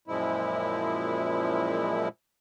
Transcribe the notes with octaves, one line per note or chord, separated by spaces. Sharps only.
F#2 A#2 F3 G#3 E4